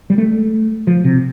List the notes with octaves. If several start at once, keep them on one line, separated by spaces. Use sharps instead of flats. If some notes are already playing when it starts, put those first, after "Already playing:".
G3
A3
F3
C3